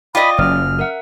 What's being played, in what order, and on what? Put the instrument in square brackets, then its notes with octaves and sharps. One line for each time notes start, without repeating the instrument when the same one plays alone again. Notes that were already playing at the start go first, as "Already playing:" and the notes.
[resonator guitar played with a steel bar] F4 D#5 [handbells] D5 G5 D6 [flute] B5
[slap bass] F#1 F#3 [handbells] C#4 [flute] F6
[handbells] A#4 E5 F#5